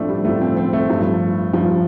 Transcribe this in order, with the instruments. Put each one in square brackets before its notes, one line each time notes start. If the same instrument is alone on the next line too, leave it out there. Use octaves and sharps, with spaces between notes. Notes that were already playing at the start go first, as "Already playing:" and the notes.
Already playing: [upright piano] A2 F3 A3 C4 D4
G3
A2 F3 A3
C4
C4
A3
G2 F3
G2 F3